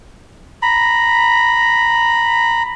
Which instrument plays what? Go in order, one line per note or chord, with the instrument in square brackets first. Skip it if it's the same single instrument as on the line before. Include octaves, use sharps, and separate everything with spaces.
[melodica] A#5 B5